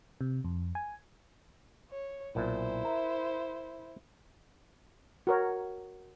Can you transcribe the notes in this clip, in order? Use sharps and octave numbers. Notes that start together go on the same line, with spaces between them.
C3
F2
G#5
C#5
B1 A#2 E4 C5
A#4 E5
F#4 A#4 C#5